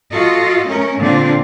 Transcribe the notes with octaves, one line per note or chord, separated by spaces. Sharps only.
F4 F#4 A4 D#5
A3 C#4 A#4
A#2 D3 C4 D4 F4